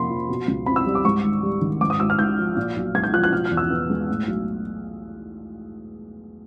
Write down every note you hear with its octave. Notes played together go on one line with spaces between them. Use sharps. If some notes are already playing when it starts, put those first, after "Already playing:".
Already playing: F2 C3 A#3 B5 C6
F3
B2
C#2
C4 B5
E6
G3
D6
G#2 C#6
G#1
G3
D#3
G#2 D6
D#6
G#1 E6
F6
G#1 G6
F3
A#2
B1
G#3 G#6
G6
F3 F#6
F#6
B2 F6
F6
E2
E6
B3
G#3
A2
B1